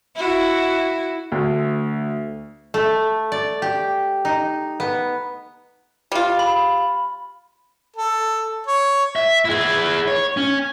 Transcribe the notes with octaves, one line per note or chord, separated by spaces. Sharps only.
E4 F#4
D2
A3
D5
G4
D#4
B3
G3 F4
B5
A4
C#5
E5
E4 G#4
C#5
C#4